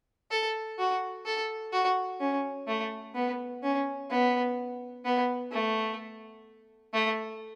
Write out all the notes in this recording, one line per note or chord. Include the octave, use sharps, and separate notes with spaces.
A4
F#4
A4
F#4
C#4
A3
B3
C#4
B3
B3
A3
A3